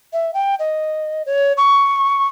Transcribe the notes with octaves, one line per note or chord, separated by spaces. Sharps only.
E5
G5
D#5
C#5
C#6